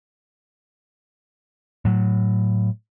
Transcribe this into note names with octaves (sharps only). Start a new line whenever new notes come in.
A2 F#3